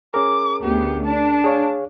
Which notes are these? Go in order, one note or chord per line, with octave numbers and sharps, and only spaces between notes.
C#4 G#4 A#4 D6
D2 B3 G4
D4 A5
G#4 C#5 F5